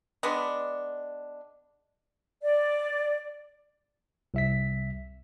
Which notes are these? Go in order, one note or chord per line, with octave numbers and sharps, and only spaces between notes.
G#3 B3 D4
D5
C2 E5 B6